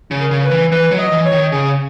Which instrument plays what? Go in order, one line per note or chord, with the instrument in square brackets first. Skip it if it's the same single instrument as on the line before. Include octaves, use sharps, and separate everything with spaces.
[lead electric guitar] C#3
[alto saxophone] A#4
[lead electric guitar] C#3
[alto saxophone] B4
[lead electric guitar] E3
[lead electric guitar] E3 [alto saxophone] B4
[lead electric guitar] F#3
[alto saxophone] D#5
[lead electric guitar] E3
[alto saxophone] C#5
[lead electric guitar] D#3
[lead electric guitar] C#3 [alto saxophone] G#4